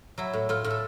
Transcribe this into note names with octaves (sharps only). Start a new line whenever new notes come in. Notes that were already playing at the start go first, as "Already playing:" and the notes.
F#3 E4
A2
A2 F4
A2
A4